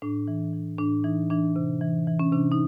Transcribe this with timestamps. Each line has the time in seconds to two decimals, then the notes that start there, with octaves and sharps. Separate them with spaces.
0.02 A2 D4
0.28 E3
0.53 E3
0.78 A2 D4
1.04 E3 D#4
1.30 E3 D4
1.56 C3
1.81 E3
2.07 E3
2.19 C#4
2.32 C3 D4
2.52 D#4